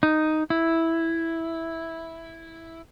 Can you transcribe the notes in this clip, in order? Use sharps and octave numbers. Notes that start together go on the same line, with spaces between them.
D#4
E4